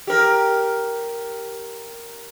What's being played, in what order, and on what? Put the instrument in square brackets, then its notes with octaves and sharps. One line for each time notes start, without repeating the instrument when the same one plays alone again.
[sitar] G4 A#4